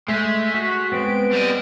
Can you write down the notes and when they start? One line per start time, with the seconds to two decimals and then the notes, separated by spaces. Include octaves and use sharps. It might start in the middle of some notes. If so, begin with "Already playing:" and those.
0.08 G#3 A3 B6
0.54 F#4 B6
0.92 B3 C4 D7
1.33 G3 D#5